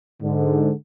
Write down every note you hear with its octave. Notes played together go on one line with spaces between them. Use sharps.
G#2 D3